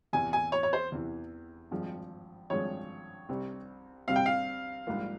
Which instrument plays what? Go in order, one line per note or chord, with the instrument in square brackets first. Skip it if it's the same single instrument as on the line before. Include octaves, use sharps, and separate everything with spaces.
[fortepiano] E2 C3 E3 [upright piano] G#5
[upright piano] G#5
C#5
C#5
C5
[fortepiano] E2 C3 E3
G#1 G2 F3 G#3
[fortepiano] G#1 G2 F3 G#3 [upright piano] C#5
[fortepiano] C2 C3 G3 C4
[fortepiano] C2 C3 G3 C4 [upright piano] F5
[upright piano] G5
F5
[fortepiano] A#1 G#2 G3 A#3 F4